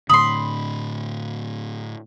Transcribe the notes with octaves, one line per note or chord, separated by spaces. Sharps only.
A2 D3 B5 C6 D#6